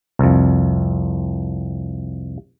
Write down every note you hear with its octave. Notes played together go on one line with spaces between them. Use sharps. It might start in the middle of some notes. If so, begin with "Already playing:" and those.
C2 F2